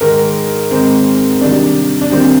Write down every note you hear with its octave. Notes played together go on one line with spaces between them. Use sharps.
G#2 D#3 G#3 A#4
G#2 D#3 G#3 C4
C3 D#3 G3 D4
D4
C3 D#3 G3 C4